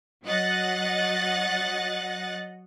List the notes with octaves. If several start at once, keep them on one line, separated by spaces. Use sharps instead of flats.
F#3 D#5 F#5 F#6 A6